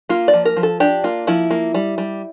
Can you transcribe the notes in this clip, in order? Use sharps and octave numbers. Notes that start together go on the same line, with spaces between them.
A#3 F4
D5
F3
A#4
F3
A4
D4 G4
A#3 F4
F3 E4
A#3
G3
G3